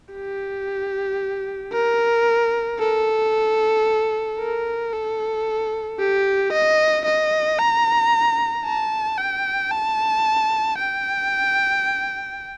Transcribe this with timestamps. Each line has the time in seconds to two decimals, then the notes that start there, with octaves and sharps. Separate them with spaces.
0.14 G4
1.73 A#4
2.80 A4
4.40 A#4
4.93 A4
6.00 G4
6.53 D#5
7.05 D#5
7.59 A#5
8.66 A5
9.18 G5
9.71 A5
10.79 G5